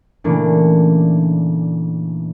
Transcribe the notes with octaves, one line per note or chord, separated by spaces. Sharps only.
A#2 C#3 E3 A3 A#3 D4